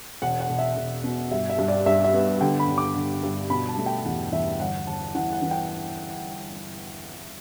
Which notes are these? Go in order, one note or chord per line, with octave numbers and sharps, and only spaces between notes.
E1 F#5
F#5
E1
E5
E1
B2
G2 E5
E5
G2
D5
G2 E5
E5
B3
D3 G5
B5
D3
D6
D3
G2
B2 B5
A5
A3
G5
E2 F#5
E2 E5
G1 F#5
G1 A5
E3 F#5
F#5
E3
G5